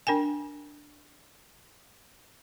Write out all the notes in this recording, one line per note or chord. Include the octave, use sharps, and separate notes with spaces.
D4 A#4 G5 G#5